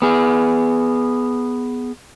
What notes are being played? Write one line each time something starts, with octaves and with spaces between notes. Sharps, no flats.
B3 G#4